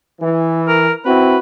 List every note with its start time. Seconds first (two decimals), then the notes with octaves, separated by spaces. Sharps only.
0.20 E3
0.68 A#4
1.05 C4 E4 F#4 B4